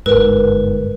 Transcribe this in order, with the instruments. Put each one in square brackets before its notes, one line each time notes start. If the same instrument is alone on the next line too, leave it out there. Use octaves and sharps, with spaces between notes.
[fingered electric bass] G1 G#2 [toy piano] A#4 [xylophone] B4